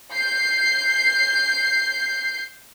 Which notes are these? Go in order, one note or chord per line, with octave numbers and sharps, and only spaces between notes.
G6 C7